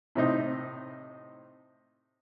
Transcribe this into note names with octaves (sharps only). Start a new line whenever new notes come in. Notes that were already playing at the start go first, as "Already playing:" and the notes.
A2 C3 D#4 C5